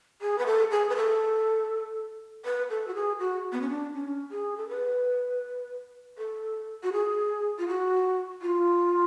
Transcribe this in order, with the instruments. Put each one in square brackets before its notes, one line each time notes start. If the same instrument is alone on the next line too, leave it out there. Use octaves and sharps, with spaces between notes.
[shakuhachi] G#4
B4
A4
G#4
B4
A4
B4
A4
F#4
G#4
F#4
B3
C#4
D4
C#4
G#4
A4
B4
A4
F#4
G#4
F4
F#4
F4